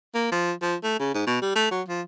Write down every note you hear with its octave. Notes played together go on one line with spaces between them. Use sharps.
A#3
F3
F3
A3
C#3
G#2
B2
G3
A3
F#3
F3